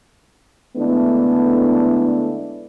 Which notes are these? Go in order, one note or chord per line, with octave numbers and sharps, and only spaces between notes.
D3 G#3 A3 B3 D4 E4